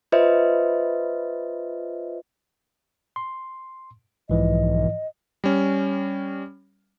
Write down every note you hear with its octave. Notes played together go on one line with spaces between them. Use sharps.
F4 B4 C5 D#5 E5
C6
B1 G#2 E3 F3 D#5
G3 C#4